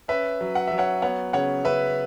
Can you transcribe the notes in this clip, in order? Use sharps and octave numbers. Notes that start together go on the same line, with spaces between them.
C#4 B4 E5
F#3
F#5
F#3 E5
C#5 F#5
B3 C#5 F#5
C#3 C#5 F#5
C#3 B4 E5